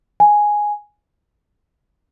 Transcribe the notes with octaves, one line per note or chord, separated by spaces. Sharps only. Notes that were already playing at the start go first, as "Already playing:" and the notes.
G#5